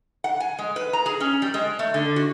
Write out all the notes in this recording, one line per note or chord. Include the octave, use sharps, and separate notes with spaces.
F#5
G#5
G#3
B4
A#5
G#4
C#4
G3
G#3
A3
D3
F#4